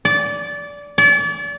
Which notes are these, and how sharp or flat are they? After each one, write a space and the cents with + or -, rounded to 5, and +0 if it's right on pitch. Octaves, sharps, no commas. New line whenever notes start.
D5 -20
D5 -35